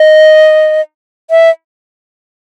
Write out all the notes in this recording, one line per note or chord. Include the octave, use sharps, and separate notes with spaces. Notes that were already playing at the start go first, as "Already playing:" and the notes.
Already playing: D#5
E5